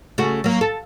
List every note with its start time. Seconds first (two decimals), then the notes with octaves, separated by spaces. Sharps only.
0.18 C#3 A3 F#4
0.44 F#3 A#3
0.61 A4